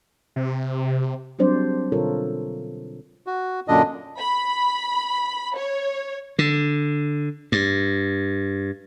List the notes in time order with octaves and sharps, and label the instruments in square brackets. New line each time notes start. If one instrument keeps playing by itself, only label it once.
[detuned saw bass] C3
[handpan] F#3 G3 C4 D4 C5 D5
B2 D3 F4 A4 A#4 C#5
[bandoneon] F#4
F#2 A#2 D3 D4 D#5
[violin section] B5
C#5
[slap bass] D3
G2